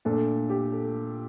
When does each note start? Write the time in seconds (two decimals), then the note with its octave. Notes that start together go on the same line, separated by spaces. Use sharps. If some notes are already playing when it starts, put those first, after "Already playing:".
0.05 A#2 A3 D4 A4
0.50 G4
0.72 A4